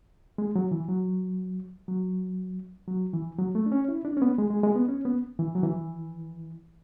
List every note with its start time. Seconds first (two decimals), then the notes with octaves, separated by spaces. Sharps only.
0.38 G#3
0.56 F#3
0.72 E3
0.89 F#3
1.88 F#3
2.88 F#3
3.14 E3
3.39 F#3
3.55 A3
3.66 D4
3.72 C#4
3.88 E4
4.05 D4
4.17 C#4
4.22 B3
4.38 G#3
4.50 G#3
4.63 G#3
4.76 B3
4.88 C#4
5.05 B3
5.39 E3
5.55 F#3
5.63 E3